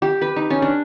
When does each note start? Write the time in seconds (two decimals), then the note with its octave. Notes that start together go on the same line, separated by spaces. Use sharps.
0.02 G4
0.21 B4
0.36 D#4
0.50 C#4
0.62 D4